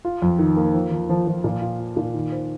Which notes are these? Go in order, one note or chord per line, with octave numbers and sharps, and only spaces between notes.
F4
F2
D#3
A#3
F3
F3
F3
F3
A#2
F4
F4
A#2
D#3
C5